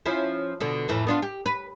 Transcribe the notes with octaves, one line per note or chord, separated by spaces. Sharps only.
F3 C#4 E4
B2 D3
F2 A2 E3
B3 D4 F4
G4
B4